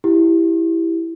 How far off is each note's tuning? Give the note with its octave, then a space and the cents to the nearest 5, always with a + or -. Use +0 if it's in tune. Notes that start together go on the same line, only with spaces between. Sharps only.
E4 +0 G4 +0